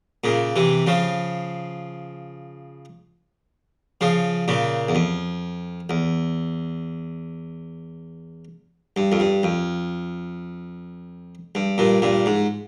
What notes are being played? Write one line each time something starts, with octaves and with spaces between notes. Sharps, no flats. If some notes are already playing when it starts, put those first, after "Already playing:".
A#2 C#3
C3 E3
C#3 F3
C#3 F3
A#2 C#3
E2
F2
E2
G2
F2
G2
F2
G2
G2 A#2
G2 A#2
G#2